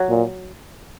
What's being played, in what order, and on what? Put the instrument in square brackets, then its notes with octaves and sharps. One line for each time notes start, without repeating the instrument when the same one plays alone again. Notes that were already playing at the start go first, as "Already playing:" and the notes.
Already playing: [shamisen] F#3
[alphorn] A#2